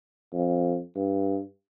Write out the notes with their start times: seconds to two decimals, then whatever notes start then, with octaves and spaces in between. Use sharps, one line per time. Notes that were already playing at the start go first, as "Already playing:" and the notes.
0.33 F2
0.96 G2